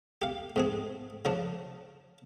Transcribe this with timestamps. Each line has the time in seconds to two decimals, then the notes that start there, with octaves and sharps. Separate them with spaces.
0.22 G4 F5
0.56 G#2 C4 G#4
1.25 C#3 F3 D4